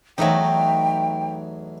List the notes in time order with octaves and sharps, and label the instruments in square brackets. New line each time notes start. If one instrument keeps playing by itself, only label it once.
[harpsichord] E2 [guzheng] F#3 A3 D#4 [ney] G5